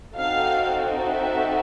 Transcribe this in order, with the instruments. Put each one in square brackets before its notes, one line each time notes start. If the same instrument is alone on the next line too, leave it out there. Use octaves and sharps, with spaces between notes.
[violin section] C4 D#4 F#4 A4 F5
E5